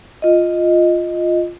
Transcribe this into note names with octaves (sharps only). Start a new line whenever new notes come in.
F4 D#5